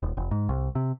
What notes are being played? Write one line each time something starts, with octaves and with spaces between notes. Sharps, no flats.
D#1
F1
G#2
C2
C3